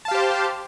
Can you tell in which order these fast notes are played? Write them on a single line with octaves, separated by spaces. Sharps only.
A5 F5 G4 C5